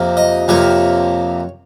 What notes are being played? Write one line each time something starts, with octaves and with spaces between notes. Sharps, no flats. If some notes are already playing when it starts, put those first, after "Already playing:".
Already playing: F2 C3 F3 A#3
D#5
F2 C3 F3 A#3 C#5